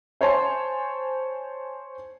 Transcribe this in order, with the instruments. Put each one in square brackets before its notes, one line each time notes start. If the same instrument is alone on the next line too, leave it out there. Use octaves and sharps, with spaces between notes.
[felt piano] C5 C#5 G#5 A5 C6